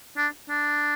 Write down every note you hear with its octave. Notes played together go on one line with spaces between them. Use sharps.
D4
D4